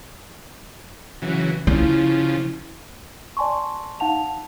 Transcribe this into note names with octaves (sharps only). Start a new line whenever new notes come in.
C#3 E3 F#3
C#3 F3 E4
D5 G#5 A5 C6 C#6
D#4 F5 F#5 A5 F7